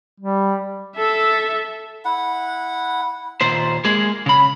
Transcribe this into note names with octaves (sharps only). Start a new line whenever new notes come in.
G3
A4 E5
E4 F#5
D#2 A#2 C5
G#3 A#3 G#4
C#3 B5